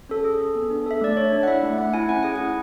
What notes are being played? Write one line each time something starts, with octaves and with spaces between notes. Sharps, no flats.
C#4 A4
G#4
G#4
B3
D4
A4 E5
A3 D5
D4 C#5
D4
F#5
E4 E5
A3
A3 F#5
E4 G#5
C#4 F#5
G#4 G#5
F#5
E4